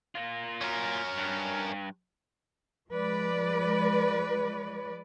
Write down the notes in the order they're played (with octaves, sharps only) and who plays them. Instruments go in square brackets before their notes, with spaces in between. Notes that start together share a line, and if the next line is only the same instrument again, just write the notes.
[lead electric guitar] A#3 F4
[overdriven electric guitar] C#4 A#4
[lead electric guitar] G2
[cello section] F3 G#3 B4 D5